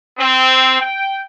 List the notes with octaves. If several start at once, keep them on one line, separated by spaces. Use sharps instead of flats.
C4
G5